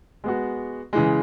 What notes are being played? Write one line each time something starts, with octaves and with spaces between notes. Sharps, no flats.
G#3 B3 F#4
C#3 E3 G#3